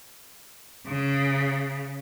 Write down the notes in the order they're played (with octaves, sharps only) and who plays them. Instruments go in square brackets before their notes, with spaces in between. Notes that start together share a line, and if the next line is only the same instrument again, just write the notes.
[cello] C#3